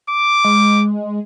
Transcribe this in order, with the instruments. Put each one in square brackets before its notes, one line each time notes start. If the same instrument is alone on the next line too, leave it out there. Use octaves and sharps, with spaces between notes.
[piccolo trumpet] D6
[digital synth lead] G#3